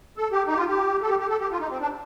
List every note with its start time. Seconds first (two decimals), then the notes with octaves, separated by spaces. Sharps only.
0.17 A4
0.32 G4
0.47 D#4
0.53 G4
0.57 F4
0.68 G4
1.02 A4
1.09 G4
1.19 G4
1.29 A4
1.40 G4
1.51 F4
1.60 D#4
1.70 C4
1.81 D4